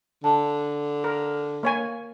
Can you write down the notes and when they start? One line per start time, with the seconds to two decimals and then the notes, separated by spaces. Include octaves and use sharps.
0.24 D3 A5
1.04 A#4
1.63 A#3 C#5 G#5